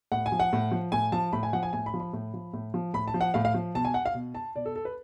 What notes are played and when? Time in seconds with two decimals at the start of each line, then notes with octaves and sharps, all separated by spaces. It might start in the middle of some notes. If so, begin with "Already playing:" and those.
0.12 A2 F#5
0.26 G#5
0.32 F3
0.40 F#5
0.53 A2
0.72 F3
0.92 A2 G#5
1.12 F3 A5
1.33 A2 B5
1.43 G#5
1.53 F3 F#5
1.63 G#5
1.73 A2 G#5
1.86 B5
1.94 F3
2.00 B5
2.13 A2
2.34 F3
2.53 A2
2.74 F3
2.93 A2 B5
3.08 A5
3.14 F3
3.21 F#5
3.34 A2 F5
3.45 F5
3.54 F3
3.75 B2 A5
3.85 G#5
3.94 F#5
4.06 F5
4.14 B2
4.35 A5
4.56 B2 D5
4.66 A4
4.76 A4
4.85 B4